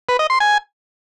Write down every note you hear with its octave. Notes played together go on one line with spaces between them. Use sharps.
B4
D#5
C6
G#5